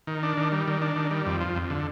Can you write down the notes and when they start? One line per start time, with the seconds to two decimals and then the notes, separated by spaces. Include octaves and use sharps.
0.07 D#3
0.23 D4
0.37 D#3
0.52 G3
0.68 D#3
0.82 D4
0.96 D#3
1.11 G3
1.26 F2
1.41 F3
1.56 F2
1.70 D3